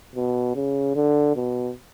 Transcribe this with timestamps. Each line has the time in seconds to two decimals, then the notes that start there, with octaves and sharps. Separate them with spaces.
0.15 B2
0.55 C#3
0.95 D3
1.36 B2